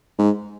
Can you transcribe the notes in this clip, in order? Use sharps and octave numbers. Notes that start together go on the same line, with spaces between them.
G#2